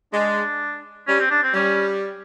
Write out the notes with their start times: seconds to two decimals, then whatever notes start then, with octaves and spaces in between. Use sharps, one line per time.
0.13 G#3 D4
1.07 G3 C#4
1.20 C4
1.31 D4
1.43 C4
1.54 G3 C#4